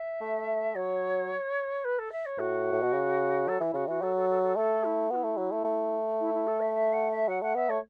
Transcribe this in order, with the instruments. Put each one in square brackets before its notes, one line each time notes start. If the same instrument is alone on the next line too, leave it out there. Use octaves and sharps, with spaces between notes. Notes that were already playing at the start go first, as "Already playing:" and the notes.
Already playing: [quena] E5
[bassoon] A3
[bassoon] F#3 [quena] C#5
[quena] B4
A4
E5
C#5
[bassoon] A2 [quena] F#4
[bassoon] A2
B2
C#3
[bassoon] F#3 [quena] A4
[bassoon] E3 [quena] E4
[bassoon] C#3 [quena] F#4
[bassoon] E3 [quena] F#4
[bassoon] F#3 [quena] A4
[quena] A4
A4
A4
[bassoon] A3 [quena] A4
[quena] E4
[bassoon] B3 [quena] F#4
[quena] E4
[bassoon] A3
F#3
A3
A3
[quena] E4
E4
A4
E5
E5
F#5
E5
[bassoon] F#3 [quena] F#5
[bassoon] A3 [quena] F#5
[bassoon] B3 [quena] E5
[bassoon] A3 [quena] C#5